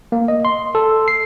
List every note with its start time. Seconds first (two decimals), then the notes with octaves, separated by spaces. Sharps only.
0.12 A#3
0.28 D#5
0.45 C6
0.75 A4
1.08 C7